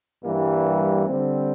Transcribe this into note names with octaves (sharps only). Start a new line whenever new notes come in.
G2 E3 G3 A#3
D3 G3 C4